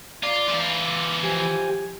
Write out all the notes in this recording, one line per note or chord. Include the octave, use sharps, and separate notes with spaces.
F4 D5 A#5 D6
E3 F4
D6
F3 G4 G#5